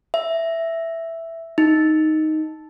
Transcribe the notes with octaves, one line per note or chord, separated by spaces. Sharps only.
E5
D#4